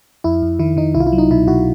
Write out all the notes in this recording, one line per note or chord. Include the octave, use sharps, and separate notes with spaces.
F2 E4
F2
D#3 E4
D#3 D#4
C2 E4
F4
E4
F#3
D#4
B2 E4
B2 E4 F#4